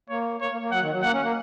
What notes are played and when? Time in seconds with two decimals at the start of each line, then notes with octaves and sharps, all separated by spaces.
0.09 A#3 C#5
0.40 A#3 C#5
0.51 A#3
0.61 A#3
0.71 F#3 F#5
0.82 D#3
0.91 F#3
1.02 A#3 F#5
1.12 C#4
1.23 A#3